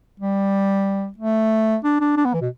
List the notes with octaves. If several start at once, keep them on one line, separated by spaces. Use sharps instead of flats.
G3
A3
D4
D4
D4
B3
E3
B2